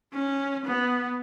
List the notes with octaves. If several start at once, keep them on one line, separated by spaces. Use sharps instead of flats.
C#4
B3